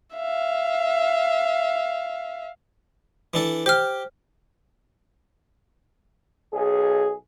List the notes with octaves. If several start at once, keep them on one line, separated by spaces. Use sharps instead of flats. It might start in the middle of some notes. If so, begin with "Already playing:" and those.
E5 F5
E3 D4 A4
G4 C5 F6
B1 G#4